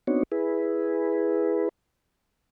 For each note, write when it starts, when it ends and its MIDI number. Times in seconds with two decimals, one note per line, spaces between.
0.07 0.23 59
0.07 0.23 60
0.07 0.23 62
0.07 0.23 63
0.07 0.23 66
0.07 0.23 73
0.32 1.69 64
0.32 1.69 68
0.32 1.69 71